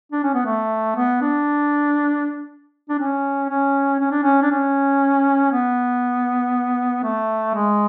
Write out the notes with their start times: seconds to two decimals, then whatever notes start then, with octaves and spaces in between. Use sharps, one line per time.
0.12 D4
0.23 C#4
0.34 B3
0.46 A3
0.96 B3
1.22 D4
2.89 D4
2.99 C#4
3.49 C#4
4.00 C#4
4.11 D4
4.23 C#4
4.42 D4
4.51 C#4
5.52 B3
7.04 A3
7.54 G#3